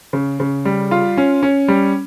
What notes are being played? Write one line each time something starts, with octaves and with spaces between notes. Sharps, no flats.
C#3
C#3
G3
F4
C#4
C#4
G3